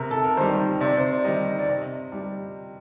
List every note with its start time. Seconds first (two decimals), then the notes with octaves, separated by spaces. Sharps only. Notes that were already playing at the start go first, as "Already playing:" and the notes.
Already playing: C3 A#4
0.11 A4
0.24 A#4
0.37 D#3 G3 C5
0.81 C3 D5
0.97 C5
1.11 D5
1.24 D#3 G3 D#5
1.59 D5
1.69 C3 D#5
2.12 G3